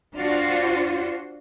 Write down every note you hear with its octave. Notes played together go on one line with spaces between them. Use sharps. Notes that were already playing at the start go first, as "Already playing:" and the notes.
D4 F4 F#4 C5